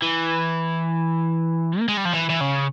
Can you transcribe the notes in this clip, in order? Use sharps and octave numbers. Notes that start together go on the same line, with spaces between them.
E3
A#3
G#3
G3
F3
E3
E3
C#3